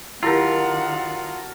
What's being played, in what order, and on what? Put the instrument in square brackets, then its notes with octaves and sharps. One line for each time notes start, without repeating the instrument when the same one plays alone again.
[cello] D#3 F#5 [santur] F#3 A4 A#4 [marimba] E4 G4 [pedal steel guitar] F4